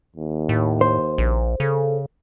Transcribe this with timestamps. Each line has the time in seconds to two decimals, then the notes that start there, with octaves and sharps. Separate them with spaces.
0.16 D#2
0.49 A2
0.81 C5
1.18 A#1
1.60 C#3 A4